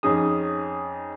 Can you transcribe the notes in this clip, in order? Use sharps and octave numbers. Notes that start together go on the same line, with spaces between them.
F2 C#4 D#4 G#4 D#6